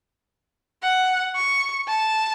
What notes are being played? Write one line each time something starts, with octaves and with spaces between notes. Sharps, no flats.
F#5
C#6
A5